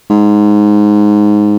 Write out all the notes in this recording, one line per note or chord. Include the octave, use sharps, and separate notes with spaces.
G#2